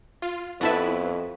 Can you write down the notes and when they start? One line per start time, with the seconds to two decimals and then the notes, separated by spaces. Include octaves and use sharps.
0.22 F4
0.61 F2 B3 E4 F#4 A4 B4 E5